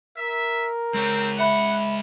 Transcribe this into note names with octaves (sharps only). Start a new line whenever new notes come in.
A#4 E5
G#3 C4 C#5
E5 F#5 B5